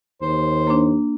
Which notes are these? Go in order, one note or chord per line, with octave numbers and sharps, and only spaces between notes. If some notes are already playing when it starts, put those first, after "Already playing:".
D#2 C5
A#3 D4